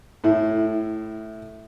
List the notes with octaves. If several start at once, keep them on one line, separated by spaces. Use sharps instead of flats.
A2 E4